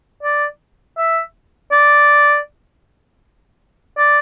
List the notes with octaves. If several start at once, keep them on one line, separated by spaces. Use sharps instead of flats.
D5
E5
D5
D5